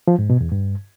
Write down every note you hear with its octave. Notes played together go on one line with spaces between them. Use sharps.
F3
G#2
B2
E2
G2